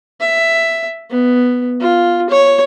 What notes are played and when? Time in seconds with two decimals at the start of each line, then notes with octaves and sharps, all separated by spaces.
0.21 E5
1.10 B3
1.80 F4
2.30 C#5